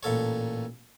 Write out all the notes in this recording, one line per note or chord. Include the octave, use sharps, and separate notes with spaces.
A1 A#2 A4 C#5